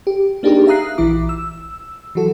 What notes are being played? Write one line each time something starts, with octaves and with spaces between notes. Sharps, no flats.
G4
A#3 D4 D#4 G4 G#4 A#4
E5 F5 A#5 D#6 F#6 C7
A#1 E3 E4 D6
E6
E3 F#3 F#4 A4